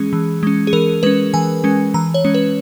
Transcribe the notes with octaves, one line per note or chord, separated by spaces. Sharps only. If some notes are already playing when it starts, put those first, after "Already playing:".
Already playing: E3 G#3 C#4 G#4
E3
G#3 C#4
G#4
E3 A#4
G#3 C#4 B4
E3 G#5
G#3 C#4
E3 A#5
C#5
G#3 C#4
B4